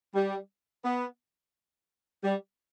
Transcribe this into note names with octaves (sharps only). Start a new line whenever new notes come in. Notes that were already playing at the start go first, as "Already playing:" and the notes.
G3
B3
G3